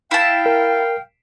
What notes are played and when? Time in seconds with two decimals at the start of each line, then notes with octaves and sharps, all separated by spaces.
0.11 E4 F5 G5 A5
0.46 A#4